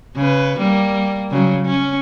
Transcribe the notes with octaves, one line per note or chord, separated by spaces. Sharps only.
C#3 B4
G3 A#3
C#3 F#3
C#4